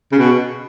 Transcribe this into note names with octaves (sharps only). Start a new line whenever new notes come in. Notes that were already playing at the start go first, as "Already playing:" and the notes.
C#3
B2